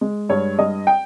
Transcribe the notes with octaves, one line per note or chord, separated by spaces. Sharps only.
G#3
G2 C#5
G2 D#5
G5